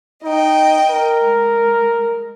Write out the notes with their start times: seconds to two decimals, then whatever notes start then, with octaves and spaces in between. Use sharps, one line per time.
0.24 D#4 D#5 G5
0.90 A#4
1.24 G#3